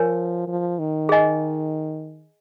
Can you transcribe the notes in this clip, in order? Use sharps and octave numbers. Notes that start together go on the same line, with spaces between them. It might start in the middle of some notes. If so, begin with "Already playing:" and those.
Already playing: F3 A#4 C#5 G#5
F3
D#3
G#4 D#5 G#5